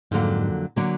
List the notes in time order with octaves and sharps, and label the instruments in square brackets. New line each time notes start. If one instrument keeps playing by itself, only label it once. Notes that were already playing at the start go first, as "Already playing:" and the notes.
[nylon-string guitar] F2 D3 F#3 A#3 [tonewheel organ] G#2
[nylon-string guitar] D3 F#3 A#3